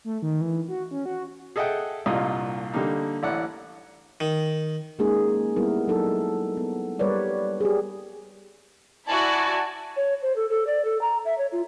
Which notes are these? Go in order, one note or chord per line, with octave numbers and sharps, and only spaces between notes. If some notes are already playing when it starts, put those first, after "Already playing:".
A3
D#3
E3
F#4
C#4
F#4
G#4 A4 D#5 E5 F#5 G5
C2 G2 A#2 F4 D#5
D3 G3 A#3 D#4
A1 E4 D5 F#5
D#3
G#3 A#3 C#4 D#4 G#4
G3 A#3 B3 E4 A#4
F#3 D#4 A4 A#4
B3
G3 A#4 B4 C#5 D5
G4 G#4
E4 F#4 D5 G#5 A5 G#6
C#5
C5
A4
A4
D5
A4
A#5
E5
C#5
F4